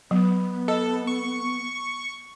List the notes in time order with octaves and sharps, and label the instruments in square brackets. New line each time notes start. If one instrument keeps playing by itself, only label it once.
[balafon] F#3 [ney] B3
[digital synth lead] A4 [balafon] D#5
[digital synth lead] C#6